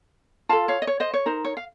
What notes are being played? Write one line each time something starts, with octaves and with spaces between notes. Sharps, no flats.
F4 A4 F5 A5
C#5 F5
D#5
C#5
C5 D#5
C#5
D#4 A#4 C5
C#5
F5